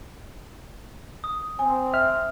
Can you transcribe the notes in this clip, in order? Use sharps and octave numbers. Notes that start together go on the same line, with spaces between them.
D#6
C4 G#5
E5 F6